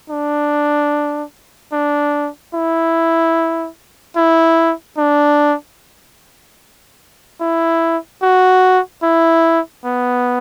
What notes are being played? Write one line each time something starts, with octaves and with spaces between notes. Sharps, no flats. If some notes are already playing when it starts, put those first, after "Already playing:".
D4
D4
E4
E4
D4
E4
F#4
E4
B3